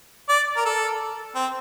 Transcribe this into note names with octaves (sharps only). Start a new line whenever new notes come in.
D5
A#4
A4
C4